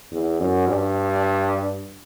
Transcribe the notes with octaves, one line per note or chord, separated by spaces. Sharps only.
E2
F#2
G2